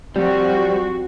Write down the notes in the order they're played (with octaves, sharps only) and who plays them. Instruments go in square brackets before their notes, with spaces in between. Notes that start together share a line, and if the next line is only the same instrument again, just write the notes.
[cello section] F3 C4 F#4 [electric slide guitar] G3